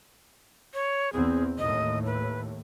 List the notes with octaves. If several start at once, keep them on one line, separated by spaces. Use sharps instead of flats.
C#5
E2 C4 G#4
D#2 A2 D#5
B4